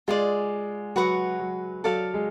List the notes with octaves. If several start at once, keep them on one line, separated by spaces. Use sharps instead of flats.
G#3 F4 G#4 D5
F#3 F#4 B4 F#5 C#6
F#3
F#3 A4 D5 F5 A5
G#3